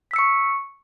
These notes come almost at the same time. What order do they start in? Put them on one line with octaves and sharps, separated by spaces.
B6 E6 C#7 C#6